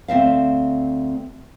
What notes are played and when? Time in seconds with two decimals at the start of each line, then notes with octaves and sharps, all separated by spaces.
0.08 D2 C4 E5 F5